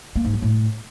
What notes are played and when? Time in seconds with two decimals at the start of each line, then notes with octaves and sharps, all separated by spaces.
0.15 A#3
0.24 G#2
0.33 F#3
0.42 A2